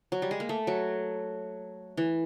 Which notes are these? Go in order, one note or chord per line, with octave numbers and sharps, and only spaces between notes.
F#3
G3
G#3
A#3
A3
F#3
E3